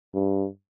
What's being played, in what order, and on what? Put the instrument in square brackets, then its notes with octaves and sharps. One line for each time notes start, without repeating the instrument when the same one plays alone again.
[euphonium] G2